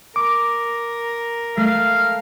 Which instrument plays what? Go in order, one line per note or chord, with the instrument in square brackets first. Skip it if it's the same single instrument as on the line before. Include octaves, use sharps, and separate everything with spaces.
[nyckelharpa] A#4 [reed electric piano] D6
[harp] A3 [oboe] F5